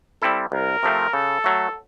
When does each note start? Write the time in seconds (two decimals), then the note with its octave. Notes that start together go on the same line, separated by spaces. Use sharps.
0.22 G3 C4 E4 A4
0.52 C2 A#4
0.83 C3 F3 A3 C4
1.13 C#3 A4
1.44 F#3 A3